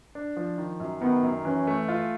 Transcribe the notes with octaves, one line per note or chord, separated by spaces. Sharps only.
D4
F3
D#3
F#2
D#3 B3
F#2
E3 C#4
A3
F4